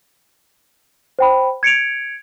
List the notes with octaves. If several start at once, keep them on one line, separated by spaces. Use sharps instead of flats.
C5 G5 B5
G#6 C#7 D7 F7